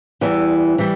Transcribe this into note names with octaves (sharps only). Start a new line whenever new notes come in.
E2 E3 G3
E3 G3